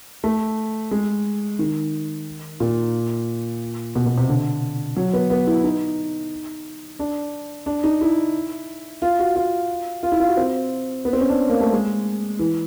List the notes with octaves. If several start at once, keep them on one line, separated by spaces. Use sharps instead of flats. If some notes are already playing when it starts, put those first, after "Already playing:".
A3
G#3
D#3
A#2
B2
B2
C3
D3
F#3
B3
B3
E4
D#4
D4
D4
D#4
E4
F4
F#4
F4
F4
E4
F4
F#4
C4
B3
C4
C#4
D4
A#3
A3
G#3
E3